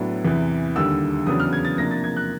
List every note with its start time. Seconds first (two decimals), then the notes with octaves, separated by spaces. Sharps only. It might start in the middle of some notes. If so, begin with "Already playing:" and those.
Already playing: A2 F#3 B3 D4
0.25 E2 C3 E3
0.76 D#2 D3 G3 E6
1.26 E2 C#3 F#3 B3 D4 D#6
1.40 F6
1.53 G#6
1.65 A6
1.78 C3 F3 A#3 D4 A#6
1.91 A6
2.04 G#6
2.16 F#6